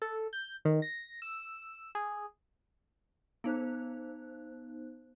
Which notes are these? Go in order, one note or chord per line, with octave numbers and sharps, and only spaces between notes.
A4
G6
D#3
A#6
E6
G#4
B3 D#4 C5 F#6